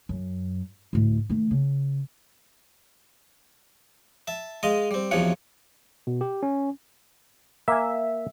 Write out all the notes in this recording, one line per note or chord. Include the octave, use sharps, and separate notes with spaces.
F#2
D2 A2
D#3 A3
C#3
E5 A5
G#3 D#5 F5 C6
G3 C4
B1 E2 C3 F3 C#5 F#5
B2
G4
C#4
A#3 E5 G#5